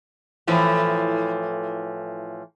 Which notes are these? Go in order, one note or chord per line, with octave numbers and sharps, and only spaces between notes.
A2 E3 F3